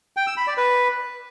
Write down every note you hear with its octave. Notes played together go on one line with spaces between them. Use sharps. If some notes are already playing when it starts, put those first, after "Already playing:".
G5
E6
B5
D5
B4